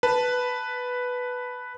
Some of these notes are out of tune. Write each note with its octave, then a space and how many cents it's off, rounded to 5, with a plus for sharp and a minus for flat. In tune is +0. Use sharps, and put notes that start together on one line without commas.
B4 +0 A5 +0